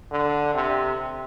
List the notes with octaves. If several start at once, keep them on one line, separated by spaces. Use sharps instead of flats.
D3
C3